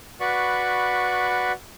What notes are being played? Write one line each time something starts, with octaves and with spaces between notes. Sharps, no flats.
F#4 B4 D5 B5 C#6